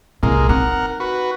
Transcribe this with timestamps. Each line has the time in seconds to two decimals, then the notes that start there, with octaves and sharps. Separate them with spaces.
0.23 C2 A#2 G#3 A#3
0.49 C4 D#4 A#4 F#5
1.00 F#4 B4